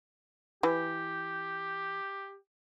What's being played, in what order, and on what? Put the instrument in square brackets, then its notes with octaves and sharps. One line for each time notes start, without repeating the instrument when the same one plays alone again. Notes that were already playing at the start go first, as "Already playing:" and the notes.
[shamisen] E3 [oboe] G4